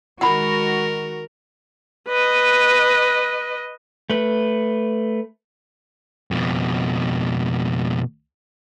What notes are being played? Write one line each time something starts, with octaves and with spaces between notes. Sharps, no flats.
D#3 G#3 F#4 A#4 F#5 B5
B4 D#5
A3 B4
F2 B2